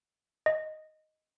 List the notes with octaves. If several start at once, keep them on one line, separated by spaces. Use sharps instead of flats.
D#5